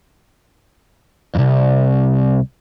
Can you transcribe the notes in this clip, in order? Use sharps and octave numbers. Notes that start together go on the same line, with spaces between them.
C2 F2